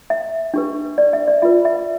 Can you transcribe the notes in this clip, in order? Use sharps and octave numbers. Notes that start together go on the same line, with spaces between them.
E5
D4 G4 B4
D5
E5
D5
F4 B4 E5
E5